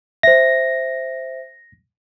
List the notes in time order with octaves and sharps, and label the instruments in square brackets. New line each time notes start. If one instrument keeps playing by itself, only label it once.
[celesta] C5 E5 [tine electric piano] A#6